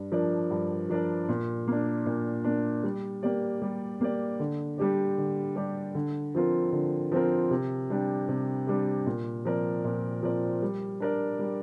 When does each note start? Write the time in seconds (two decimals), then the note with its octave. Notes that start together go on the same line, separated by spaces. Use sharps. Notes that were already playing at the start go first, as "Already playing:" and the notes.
Already playing: G2
0.12 F3 D4 A#4 D5
0.51 G2
0.89 F3 D4 A#4 D5
1.29 A#2
1.68 A#3 D4
2.06 A#2
2.44 A#3 D4
2.83 G3
3.23 A#3 G4 D5
3.62 G3
4.01 A#3 G4 D5
4.39 D3
4.78 G3 D4 G4 D5
5.18 D3
5.56 G3 D4 G4 D5
5.95 D3
6.35 F3 C4 F4 A#4
6.72 D3
7.12 F3 C4 F4 A#4
7.50 C3
7.90 G3 D4 G4
8.28 C3
8.67 G3 D4 G4
9.06 A#2
9.45 F3 C4 A#4 D5
9.84 A#2
10.23 F3 C4 A#4 D5
10.62 G3
11.00 D4 A#4 D5
11.39 G3